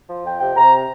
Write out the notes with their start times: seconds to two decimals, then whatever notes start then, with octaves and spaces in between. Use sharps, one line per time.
0.09 F3
0.25 F2 G5
0.40 C3 G5
0.56 C3 A#5